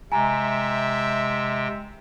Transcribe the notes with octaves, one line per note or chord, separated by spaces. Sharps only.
C3 G#3 E5 G5 G#5 A#5